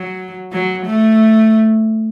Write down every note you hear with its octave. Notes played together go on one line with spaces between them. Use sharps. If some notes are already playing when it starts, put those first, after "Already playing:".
Already playing: F#3
F#3
A3